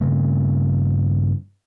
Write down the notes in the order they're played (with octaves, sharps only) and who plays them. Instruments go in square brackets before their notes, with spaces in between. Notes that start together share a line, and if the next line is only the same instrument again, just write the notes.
[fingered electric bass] G2 C#3 A3